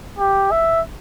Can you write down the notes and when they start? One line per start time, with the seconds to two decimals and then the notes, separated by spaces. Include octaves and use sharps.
0.19 G4
0.52 E5